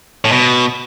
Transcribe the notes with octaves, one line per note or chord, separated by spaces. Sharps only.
A2
B2